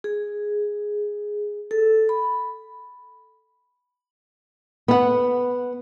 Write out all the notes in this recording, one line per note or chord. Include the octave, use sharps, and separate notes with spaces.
G#4
A4
B5
B3 F#5